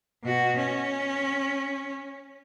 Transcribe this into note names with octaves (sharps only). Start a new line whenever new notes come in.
B2 F#4
C#4